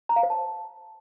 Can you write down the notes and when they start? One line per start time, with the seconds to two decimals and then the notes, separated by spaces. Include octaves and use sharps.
0.09 A#5
0.16 F5
0.23 C5
0.30 A5